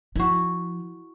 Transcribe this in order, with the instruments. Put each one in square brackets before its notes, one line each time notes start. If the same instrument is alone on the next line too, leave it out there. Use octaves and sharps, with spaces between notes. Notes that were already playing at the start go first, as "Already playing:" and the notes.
[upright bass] F3 [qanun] E4 F#4